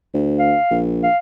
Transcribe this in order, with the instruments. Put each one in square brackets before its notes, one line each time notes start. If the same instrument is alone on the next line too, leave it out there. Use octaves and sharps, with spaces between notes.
[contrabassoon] D2
[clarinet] F5
[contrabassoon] A#1
[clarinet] F5